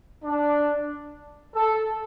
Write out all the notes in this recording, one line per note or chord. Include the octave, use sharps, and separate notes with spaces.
D4
A4